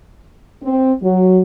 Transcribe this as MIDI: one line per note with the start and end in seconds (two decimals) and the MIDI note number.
0.63 0.92 60
1.02 1.42 54